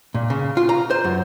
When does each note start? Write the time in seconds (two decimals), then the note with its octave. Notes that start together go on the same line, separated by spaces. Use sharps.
0.14 A#2
0.30 C#3
0.57 F4
0.69 A#5
0.91 C5
1.04 F#2